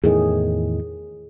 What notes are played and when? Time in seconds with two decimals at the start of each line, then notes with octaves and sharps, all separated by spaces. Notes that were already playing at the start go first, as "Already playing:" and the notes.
0.04 E2 A2 D#3 G#4